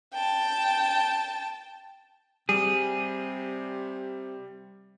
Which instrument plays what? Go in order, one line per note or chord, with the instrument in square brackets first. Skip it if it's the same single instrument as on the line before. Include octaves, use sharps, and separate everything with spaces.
[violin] G5 A5
[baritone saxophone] C3 [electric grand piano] G3 [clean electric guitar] G#4